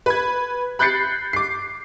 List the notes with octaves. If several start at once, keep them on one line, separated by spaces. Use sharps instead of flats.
B4 G#6
B5 F#6 G6 A6 C7 C#7
D6 C7